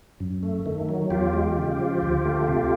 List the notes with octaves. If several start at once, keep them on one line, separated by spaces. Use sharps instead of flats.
F#2
A3
D#3
F#3
E2 F4 G4
G#3
C#3
F3
D2
A3
C3